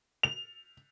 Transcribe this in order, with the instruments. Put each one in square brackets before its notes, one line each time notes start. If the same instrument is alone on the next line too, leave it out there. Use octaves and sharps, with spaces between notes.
[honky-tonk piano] F7